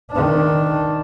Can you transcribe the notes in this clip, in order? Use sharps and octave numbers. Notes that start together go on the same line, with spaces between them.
D#3 D4